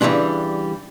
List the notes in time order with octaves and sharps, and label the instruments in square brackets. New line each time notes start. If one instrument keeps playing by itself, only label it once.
[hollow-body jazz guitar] C#3 E3 F3 G3 G#3 D4